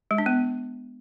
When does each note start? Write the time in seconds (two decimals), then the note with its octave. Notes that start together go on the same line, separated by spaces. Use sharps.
0.11 G#3
0.18 D4
0.26 B3